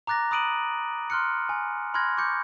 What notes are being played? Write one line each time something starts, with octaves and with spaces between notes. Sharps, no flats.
A#5 D6 F#6 A6 A#6
B5 D#6 F#6 D7 D#7 F#7
C6 F6 F#6 C#7
G#5
B5 C6 F6 F#6 G#6 A#6
C#6 D6 G6 C#7